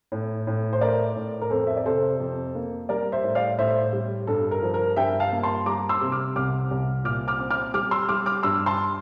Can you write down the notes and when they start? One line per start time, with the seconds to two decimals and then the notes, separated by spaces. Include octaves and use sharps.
0.12 A2
0.47 A2
0.73 C5
0.81 A3 A#4 D5
1.16 A2
1.41 A#4
1.50 F2 A4 C5
1.67 E5
1.77 D5
1.85 C3 A4 C5
2.20 F2
2.55 A#3
2.89 G3 A#4 D5
3.12 C5 E5
3.24 A2
3.35 D5 F5
3.58 A2 C5 E5
3.93 G3
4.27 G2 A4
4.51 A#4
4.63 F3
4.74 A#4
4.96 G2 E5 G5
5.20 F5 A5
5.32 A#3
5.43 A5 C6
5.66 G3 A#5 D6
5.89 C6 E6
6.01 C3
6.12 D6 F6
6.36 C2 D6 F6
6.71 C2
7.04 A#2 D6 F6
7.28 D6 F6
7.39 C4
7.51 D6 F6
7.74 G3 D6 F6
7.91 C6 E6
8.09 G3 D6 F6
8.26 D6 F6
8.43 G2 C6 E6
8.66 A5 C6